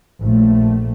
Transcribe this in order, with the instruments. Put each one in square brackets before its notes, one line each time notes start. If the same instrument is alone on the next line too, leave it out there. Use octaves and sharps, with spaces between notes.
[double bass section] A#1 A3